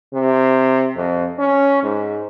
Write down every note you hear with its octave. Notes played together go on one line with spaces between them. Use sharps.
C3
F2
C#4
G#2